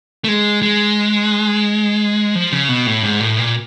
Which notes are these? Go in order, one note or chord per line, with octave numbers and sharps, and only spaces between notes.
A3
G#3
G#3
F3
C#3
B2
A2
G#2
A2
A#2